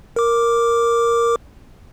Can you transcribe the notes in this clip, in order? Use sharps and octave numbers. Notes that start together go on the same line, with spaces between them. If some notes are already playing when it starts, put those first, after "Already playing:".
A#4 D6